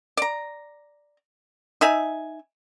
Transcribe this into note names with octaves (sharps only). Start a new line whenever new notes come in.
D5 A#5
D#4 E5 G#5